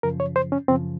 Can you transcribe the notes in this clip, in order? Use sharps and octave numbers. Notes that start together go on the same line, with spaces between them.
F#2 C#3 F3 A#4
C#5
C5
C#4
F#2 C#3 F3 C4